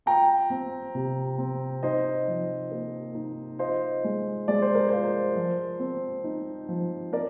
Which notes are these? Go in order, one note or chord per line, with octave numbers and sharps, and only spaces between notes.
F4 G5 A#5
C4
C3
C4
D#4 C5 D#5
F3
A#3
D#4
F4 C5 D#5
G#3
G#3 D5
C5
A#4
F4 C5
F3
C4
D#4
F3
C4 A#4 D5